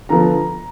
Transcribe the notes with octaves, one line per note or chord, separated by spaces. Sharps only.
D3 F3 B3 A#5